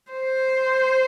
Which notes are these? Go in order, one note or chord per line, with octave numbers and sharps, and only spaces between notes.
C5